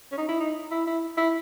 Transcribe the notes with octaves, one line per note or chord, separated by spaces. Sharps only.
C#4
D#4
E4
D#4
E4
E4
E4